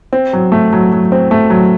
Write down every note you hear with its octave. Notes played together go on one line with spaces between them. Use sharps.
C4
F#3
A3
F#3
F#3
C4
A3
F#3